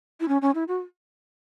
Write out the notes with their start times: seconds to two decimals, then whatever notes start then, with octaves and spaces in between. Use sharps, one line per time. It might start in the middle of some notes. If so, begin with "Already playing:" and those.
0.20 E4
0.28 C#4
0.42 C#4
0.55 E4
0.68 F#4